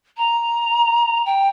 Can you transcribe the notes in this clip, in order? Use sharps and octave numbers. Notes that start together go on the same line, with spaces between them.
A#5
G5